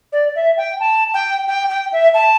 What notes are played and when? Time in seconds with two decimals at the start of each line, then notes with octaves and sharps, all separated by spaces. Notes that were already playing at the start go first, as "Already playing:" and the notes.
0.13 D5
0.36 E5
0.57 G5
0.80 A5
1.14 G5
1.48 G5
1.70 G5
1.92 E5
2.14 A5